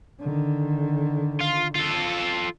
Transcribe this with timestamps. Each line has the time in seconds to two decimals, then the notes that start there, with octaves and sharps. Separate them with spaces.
0.20 D3 D#3
1.40 F4
1.75 F4 A4